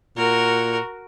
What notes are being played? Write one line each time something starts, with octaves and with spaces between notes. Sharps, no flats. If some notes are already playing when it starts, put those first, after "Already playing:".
A#2 F#4 A#4